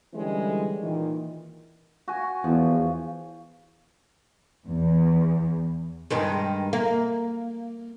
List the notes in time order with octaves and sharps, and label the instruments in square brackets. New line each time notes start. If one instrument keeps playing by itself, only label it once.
[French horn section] D3 E3 G3 G#3 C#4
A#2 D#3 E3
[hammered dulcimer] F#4 G#5
[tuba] E2 [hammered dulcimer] F3
[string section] E2
[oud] G2 D#3 G#3
A#3